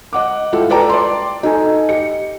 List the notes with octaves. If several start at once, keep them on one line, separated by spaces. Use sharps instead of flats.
D#5 F#5 D6
G3 E4 F4 G4 A4
A4 B4 D5 G5 A5 A#5
D5 C6
D#4 A4 G#5
G4 D#5 C#7